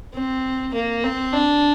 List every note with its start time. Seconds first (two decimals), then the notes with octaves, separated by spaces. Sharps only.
0.14 C4
0.74 A#3
1.04 C4
1.34 D4